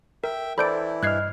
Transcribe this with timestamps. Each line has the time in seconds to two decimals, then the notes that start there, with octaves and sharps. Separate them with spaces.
0.24 A#4 E5 G5
0.58 E3 E4 A4 C5 D5 B5 G6 D7
1.03 G2 D#5 F6 F#6 G#6 C7